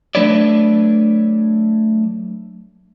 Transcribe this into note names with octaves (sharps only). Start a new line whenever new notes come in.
F#3 A3 D4 B4 C#5 D5